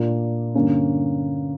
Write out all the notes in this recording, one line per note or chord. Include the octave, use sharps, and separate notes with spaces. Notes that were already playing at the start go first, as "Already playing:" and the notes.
Already playing: A#2 A#3 D4
G2 D3 A#3 C#4